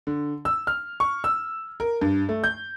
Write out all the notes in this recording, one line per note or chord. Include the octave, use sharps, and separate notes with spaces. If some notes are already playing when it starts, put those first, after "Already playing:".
D3
E6
F6
C#6
E6
A#4
G2
A3
G6